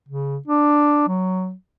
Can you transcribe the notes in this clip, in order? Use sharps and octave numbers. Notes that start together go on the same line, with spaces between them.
C#3
D4
F#3